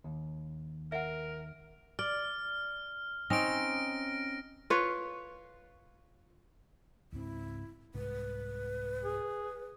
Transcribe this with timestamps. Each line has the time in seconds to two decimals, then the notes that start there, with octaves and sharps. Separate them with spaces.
0.04 D#2
0.92 A#4 E5 F#5
1.99 D5 F6
3.30 C4 C#4 D#4 A#6 D7
4.70 F4 B4 C#5
7.12 C#2 G#2 C4 E4
7.94 C2 G#2 B4
9.03 G#4